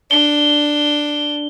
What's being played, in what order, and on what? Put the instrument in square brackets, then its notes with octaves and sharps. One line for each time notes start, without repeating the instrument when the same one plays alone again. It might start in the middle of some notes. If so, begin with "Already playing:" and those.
[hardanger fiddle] D4 [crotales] G7